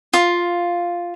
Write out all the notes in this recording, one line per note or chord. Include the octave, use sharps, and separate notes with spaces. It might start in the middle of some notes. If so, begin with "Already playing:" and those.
F4